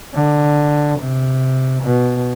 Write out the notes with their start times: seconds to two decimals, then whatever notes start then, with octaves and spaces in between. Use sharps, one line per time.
0.14 D3
0.99 C3
1.83 B2